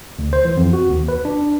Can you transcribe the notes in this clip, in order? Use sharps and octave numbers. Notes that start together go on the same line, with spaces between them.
D2
C5
E3
F2
F#4
D#2
B4
D4